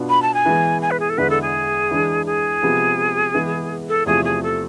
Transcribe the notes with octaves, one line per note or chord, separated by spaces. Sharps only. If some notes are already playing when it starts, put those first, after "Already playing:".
Already playing: B2 B3 D4 F4
B5
A5
G#5
E3 G#3 B3
G#5
B4
G#4
A4
E2 D3 G#3 B3 E4 B4
A4
G#4
E3 G#3 D4
G#4
C3 F3 G#3 B3
E3 G#3 B3
A4
E2 C3 F3 A3 G#4
G#4
A4